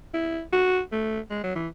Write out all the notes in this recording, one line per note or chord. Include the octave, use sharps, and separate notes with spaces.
E4
F#4
A3
G#3
F#3
E3